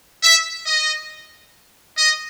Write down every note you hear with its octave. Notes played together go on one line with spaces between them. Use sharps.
E5
D#5
D#5